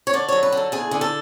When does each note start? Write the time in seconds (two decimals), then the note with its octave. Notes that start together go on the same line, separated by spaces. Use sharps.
0.07 C#5
0.13 D3 D5
0.28 F#3 C#5
0.43 B4
0.52 D3 A4
0.72 E2 G#4
0.91 D3
1.01 A4